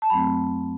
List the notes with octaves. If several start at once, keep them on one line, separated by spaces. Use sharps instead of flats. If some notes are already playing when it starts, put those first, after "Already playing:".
A5
F#2 F#3 A3 C4 B5